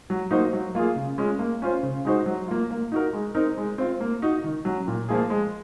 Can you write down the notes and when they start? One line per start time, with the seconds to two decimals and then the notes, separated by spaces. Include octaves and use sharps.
0.10 F#3
0.31 A#3 D#4 F#4 C5
0.53 F#3
0.75 A#3 F4 G#4
0.96 C#3
1.18 G#3 C#4 F4
1.39 A#3
1.62 C#4 F4 C5
1.83 C#3
2.05 G#3 D#4 F#4 C5
2.26 F#3
2.48 A#3 F4
2.71 A#3
2.92 D#4 F#4 A#4
3.13 G#3
3.35 C4 D#4 A#4
3.57 G#3
3.78 C4 F4
4.00 A#3
4.22 D#4 F#4
4.44 D#3
4.65 F#3 C#4
4.88 A#2
5.09 F3 A#3 F4 G#4
5.30 G#3